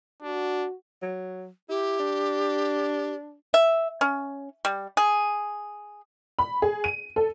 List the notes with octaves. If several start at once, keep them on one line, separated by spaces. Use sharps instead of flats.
D4 F#4
F#3
E4 G4
D4
E5
C#4
G3
G#4
B5
G#4
D#7
A4